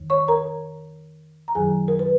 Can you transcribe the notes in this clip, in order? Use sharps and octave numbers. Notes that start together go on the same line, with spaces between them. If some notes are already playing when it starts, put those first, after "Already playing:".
Already playing: F2 D#3
C#5 C#6
A#4 A#5
A#5
F#2 D#3 F#3 G#4 G#5
A#4
B4